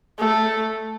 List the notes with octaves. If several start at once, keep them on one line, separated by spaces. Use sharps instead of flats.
A3